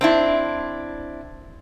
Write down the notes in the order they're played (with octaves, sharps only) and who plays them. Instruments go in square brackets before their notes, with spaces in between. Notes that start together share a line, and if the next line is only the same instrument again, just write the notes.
[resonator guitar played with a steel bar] C4 D4 E4